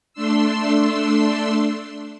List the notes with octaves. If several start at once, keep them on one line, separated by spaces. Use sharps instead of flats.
A3 D4 C6 E6